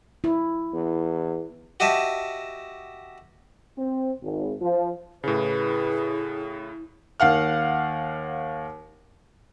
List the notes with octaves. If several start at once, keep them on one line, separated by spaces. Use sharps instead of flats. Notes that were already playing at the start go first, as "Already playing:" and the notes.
E4
E2
F#4 G4 D#5 E5 A5
C4
G#1
F3
A2 C#3 E4 G#4 B4
D#2 F5 F#5 F6